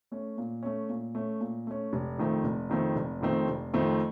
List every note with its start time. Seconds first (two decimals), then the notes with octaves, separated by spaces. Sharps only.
0.12 A3 C#4
0.38 A#2
0.63 A3 C#4
0.89 A#2
1.15 A3 C#4
1.40 A#2
1.67 A3 C#4
1.93 F1
2.18 F2 D#3 A3 C4
2.44 F1
2.70 F2 D#3 A3 C4
2.96 F1
3.21 F2 D#3 A3 C4
3.47 F1
3.74 F2 D#3 A3 C4